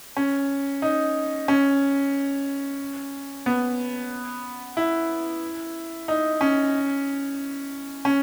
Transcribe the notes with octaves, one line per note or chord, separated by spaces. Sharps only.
C#4
D#4
C#4
B3
E4
D#4
C#4
C#4